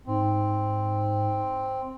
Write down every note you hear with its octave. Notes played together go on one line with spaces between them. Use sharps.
G#2 C4